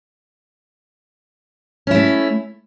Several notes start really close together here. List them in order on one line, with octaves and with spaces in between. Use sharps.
C#4 E4 A3